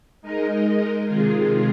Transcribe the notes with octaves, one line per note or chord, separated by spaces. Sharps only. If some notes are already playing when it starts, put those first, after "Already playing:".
G#3 D#4 A#4 D#5
C3 D#3 G#3 F4 G#4